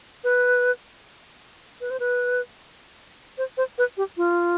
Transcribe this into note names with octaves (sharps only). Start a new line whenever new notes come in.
B4
B4
C5
B4
C5
C5
B4
G4
F4